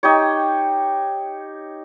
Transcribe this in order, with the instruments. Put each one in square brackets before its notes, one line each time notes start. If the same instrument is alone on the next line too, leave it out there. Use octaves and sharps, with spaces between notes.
[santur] D#4 G4 C#5